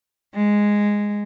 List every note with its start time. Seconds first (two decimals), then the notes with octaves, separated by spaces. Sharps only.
0.34 G#3